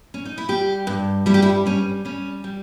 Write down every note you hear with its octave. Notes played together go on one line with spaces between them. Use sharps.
C#4
D#4
E4
G3 G4
G2
G3 E4
G4
E4
G3 C#4
G3 C#4
G3